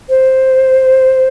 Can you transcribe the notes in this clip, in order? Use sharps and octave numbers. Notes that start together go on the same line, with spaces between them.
C5